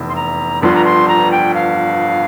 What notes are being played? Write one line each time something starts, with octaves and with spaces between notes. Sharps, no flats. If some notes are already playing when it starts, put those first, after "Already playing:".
Already playing: F1 E2
C6
A#5
G1 G2 F3 C6
A#5
C6
A#5
G5
F5